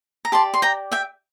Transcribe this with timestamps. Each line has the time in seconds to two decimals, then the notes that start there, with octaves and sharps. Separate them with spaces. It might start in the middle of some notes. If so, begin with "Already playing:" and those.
0.25 A#5
0.32 G4 D5 A5 C6
0.54 C6
0.62 G5 A#5
0.92 E5 G5